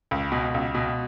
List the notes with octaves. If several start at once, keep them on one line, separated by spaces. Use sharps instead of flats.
C#2
B2
C#2
B2